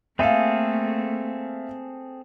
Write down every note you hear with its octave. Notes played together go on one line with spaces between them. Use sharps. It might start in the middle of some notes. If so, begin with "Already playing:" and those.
A3 A#3 C4 G#4 A4 E5 F5